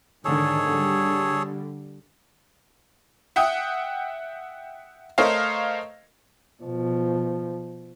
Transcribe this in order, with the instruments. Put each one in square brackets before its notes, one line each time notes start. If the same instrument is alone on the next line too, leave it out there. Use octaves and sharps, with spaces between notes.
[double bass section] G#2 D3 D#3 [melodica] G#4 A4 C#5
[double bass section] D3 G3
[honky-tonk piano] E5 F#5 G5 D#6
A3 A#4 C5 C#5 D#5 F5
[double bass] B2 F3